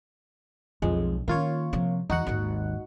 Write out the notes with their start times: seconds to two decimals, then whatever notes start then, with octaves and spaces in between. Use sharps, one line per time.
0.82 B1 F2 G#3
1.28 D#3 A#3 C#4 F4 C#5
1.73 C3 F3
2.10 E2 E3 D#4 F#4 F#5
2.27 G#1 D#2